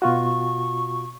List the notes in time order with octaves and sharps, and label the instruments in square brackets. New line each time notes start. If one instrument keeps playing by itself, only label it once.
[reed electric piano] B2 F4 F#4 [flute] C#6